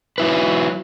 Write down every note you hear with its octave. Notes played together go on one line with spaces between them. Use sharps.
F#3 E4 B4